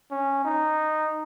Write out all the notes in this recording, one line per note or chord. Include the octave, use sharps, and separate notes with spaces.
C#4
D#4